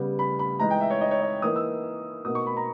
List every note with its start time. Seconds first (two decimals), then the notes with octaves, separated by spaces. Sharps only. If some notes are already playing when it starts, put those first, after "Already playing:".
Already playing: C#3 G3 B3
0.19 B5
0.39 B5
0.60 E3 G#3 D#4 A#5
0.71 G5
0.81 E5
0.90 C#5
1.01 D#5
1.11 C#5
1.22 D#5
1.42 E3 A#3 D#4 D#6
1.56 E6
2.25 B2 A#3 D#4 D#6
2.35 C#6
2.47 B5
2.57 A#5